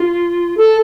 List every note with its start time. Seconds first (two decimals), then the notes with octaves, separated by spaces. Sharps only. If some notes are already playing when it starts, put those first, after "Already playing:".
Already playing: F4
0.57 A4